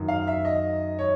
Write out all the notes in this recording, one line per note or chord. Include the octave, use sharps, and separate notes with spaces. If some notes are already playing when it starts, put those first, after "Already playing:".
Already playing: F#2 D#3
F5
E5
D#5
C#5